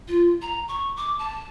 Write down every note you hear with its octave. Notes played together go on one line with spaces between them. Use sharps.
F4
A#5
C#6
D6
A5